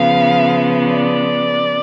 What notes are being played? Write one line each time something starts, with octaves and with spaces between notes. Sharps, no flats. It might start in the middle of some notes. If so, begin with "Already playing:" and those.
Already playing: C#3 F3 B3 F5
D5